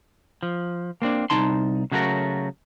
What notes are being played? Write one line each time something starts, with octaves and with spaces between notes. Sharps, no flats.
F3
A#3 C4 D4
C2 D#4 A5 C6
C#3 F#3 A3 F#4 A#4